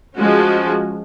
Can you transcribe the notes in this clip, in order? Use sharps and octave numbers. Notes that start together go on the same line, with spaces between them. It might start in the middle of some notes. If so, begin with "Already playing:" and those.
F3 G#3 C#4 F#4